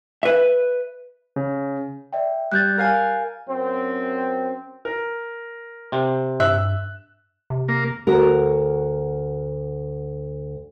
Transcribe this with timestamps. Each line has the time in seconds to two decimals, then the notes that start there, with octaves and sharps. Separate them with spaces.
0.23 B4 E5
1.36 C#3
2.13 D5 E5 G5
2.52 G3 F#6 G6 A6
2.77 A#4 F5 G#5
3.48 F#2 C4
4.85 A#4
5.92 C3
6.40 G2 E5 E6 F#6
7.50 C3
7.68 A#3
8.07 D2 F#4 A#4